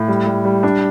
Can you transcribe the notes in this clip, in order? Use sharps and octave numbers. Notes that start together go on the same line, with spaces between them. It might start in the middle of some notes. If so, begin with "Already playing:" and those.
Already playing: A2
G3
G3
G3
D4